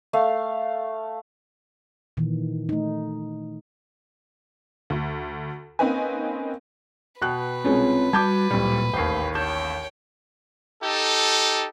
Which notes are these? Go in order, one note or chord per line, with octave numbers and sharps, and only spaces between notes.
A3 F5
A#2 D#3 E3
A3 D#4
D2
A#3 C4 C#4 D#4 B4 G#5
B2 B4 G5 F#6
C2 G#3 C4 C#4 F4 C#5
G3 F#4 A5 D6 G6 G#6
D1 A#2 G3
A1 D#2 A3 C5 G5 C7
C#5 G5 A5 G6
D#4 G4 A4